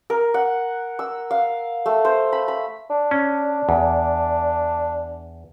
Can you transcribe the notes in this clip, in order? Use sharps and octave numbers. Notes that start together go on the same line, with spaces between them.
A#4
F#5
E6
F5
A3
C5
B5
B5
D4
C#4
E2